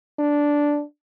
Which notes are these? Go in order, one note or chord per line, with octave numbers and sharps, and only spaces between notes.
D4